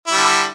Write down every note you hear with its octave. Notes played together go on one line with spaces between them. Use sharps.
D3 G3 E4